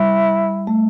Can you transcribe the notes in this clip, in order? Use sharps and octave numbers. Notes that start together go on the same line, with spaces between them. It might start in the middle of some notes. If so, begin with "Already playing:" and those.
Already playing: G3 E4
A3